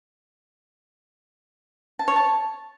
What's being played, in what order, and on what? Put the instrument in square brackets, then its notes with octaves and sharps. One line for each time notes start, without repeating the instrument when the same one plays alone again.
[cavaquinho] A5
C#5
A5